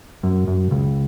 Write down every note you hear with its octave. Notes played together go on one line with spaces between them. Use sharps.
F#2
F#2
C#2